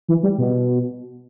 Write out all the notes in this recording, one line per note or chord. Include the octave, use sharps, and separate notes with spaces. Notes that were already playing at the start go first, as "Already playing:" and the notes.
E3
G3
B2